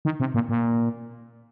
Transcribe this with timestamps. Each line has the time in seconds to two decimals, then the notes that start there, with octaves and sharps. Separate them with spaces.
0.05 D#3
0.20 C3
0.34 A#2
0.49 A#2